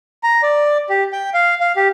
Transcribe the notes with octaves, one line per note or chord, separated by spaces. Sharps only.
A#5
D5
G4
G5
F5
F5
G4